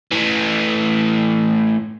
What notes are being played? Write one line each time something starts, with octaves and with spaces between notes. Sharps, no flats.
A2 E3